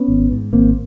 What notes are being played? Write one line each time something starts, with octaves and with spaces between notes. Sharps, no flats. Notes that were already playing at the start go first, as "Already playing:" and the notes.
Already playing: B3 C#4
G#1
G#2
G#1 A#3 C4